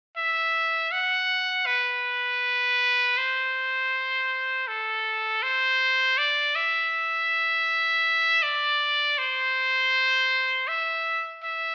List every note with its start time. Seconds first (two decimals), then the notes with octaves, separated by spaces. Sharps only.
0.17 E5
0.92 F#5
1.66 B4
3.17 C5
4.68 A4
5.43 C5
6.18 D5
6.55 E5
8.43 D5
9.18 C5
10.67 E5
11.43 E5